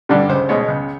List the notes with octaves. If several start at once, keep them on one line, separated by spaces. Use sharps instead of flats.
G2 D3 G3
C#2 C5
B2 G#3 C#5
C#2